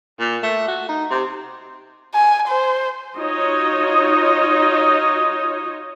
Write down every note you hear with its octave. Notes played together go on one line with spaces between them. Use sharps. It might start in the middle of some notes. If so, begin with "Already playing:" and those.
A#2
A3
F#4
D#4
C3
G#5
C5
D#4 F4 F#4 C#5 D#5